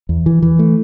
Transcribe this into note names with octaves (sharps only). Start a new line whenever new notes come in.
E2
E3
E3
A3